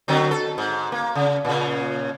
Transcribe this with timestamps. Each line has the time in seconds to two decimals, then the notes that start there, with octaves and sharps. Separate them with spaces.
0.08 D3 F#3 C4
0.31 A4
0.58 G#2
0.92 A#3
1.15 C#3
1.45 A#2 C#3